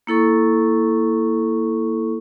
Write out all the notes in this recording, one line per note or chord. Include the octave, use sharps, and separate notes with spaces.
A#3 E4 A4 C#6